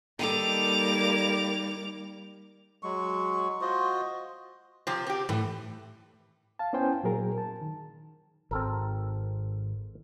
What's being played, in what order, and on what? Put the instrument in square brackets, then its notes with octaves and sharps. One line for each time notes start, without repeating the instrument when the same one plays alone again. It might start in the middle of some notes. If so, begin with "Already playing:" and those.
[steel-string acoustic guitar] D#3 D#4 A4 [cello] G3 A#3 [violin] D6 F7
[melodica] F#3 G#3 C#6
F4 F#4 C5 D#5
[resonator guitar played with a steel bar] C3 F3 C4
C4 G4
[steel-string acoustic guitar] A2 [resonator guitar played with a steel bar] E3
[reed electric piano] F5 A5
B3 C#4 E4 C5 G5 G#5
A#2 F#3 G#4 A#4
A5
D#3
[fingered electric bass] G#1 [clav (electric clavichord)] C4 A4 A#4